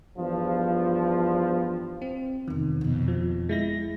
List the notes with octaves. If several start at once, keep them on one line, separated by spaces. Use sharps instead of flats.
E2 G2 F3
C4 E4
F1 E2 D#3
F2 B2
F3
G#3 E4 A#6